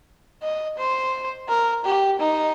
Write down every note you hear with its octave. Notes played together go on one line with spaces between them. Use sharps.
D#5
C5
A#4
G4
D#4